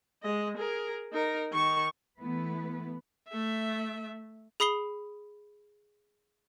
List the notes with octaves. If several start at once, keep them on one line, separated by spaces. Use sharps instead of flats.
G#3 D#5
G#4 A#4
D#4 A#4
D#3 C#6
E3 A3 B3 E4 B4
A3 E5
G#4 B5 D#6 C7 G7